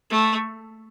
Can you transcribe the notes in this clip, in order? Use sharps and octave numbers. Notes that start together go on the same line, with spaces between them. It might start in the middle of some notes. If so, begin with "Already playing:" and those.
A3